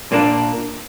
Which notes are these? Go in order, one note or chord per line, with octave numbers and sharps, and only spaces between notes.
A#2 A#3 D4